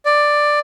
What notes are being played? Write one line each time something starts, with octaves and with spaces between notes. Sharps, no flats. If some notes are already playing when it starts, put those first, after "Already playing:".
D5